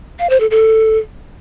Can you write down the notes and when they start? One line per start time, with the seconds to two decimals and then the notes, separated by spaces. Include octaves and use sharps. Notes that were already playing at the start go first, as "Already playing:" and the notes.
0.19 F5
0.30 C5
0.40 A4
0.51 A4